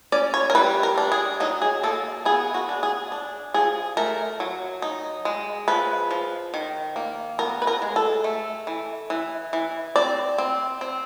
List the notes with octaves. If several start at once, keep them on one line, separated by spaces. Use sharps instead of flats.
C#4 D5
C#5
A#4
G3 B4
A#4
D4
G#4
F#3 D#4
G#4
A#3 A4
B3 G#4
F#4
D4
G#4
D4
F3 G#4
A3 A#4
F#3
D#4
G#3
F3 B4
F3
D#3
A#3
B3 A#4
B4
A#4
G#3
A4
A3
E3
E3
E3
C4 D5
C4
C4